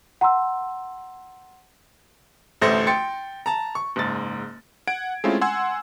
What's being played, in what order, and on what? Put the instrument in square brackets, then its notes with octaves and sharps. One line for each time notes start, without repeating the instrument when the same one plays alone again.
[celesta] F#5 A#5 C6 E6
[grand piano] A1 D2 A3 C5 A#6
G5 C6 A6 C#7
A5 A#5
C#6
F#1 G#2 A6
[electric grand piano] F#5 G#6 D7
G#3 A3 C4 C#4 E4 F4
F#5 G#5 C6 E6 G#6